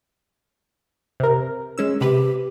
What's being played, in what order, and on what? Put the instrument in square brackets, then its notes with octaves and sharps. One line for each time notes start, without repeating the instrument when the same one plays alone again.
[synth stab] C3 A#4
G#3 C#4 E6
[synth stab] C3 B4 [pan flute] G4